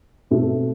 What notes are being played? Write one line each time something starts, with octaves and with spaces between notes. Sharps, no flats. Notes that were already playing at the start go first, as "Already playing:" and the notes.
B2 A3 C4